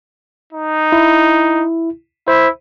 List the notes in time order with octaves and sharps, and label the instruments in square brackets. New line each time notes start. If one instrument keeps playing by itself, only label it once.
[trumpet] D#4
[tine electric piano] E4
[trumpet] E4 [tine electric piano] C5